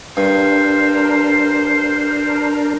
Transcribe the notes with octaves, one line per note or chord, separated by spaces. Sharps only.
G2 D4 A#4 C5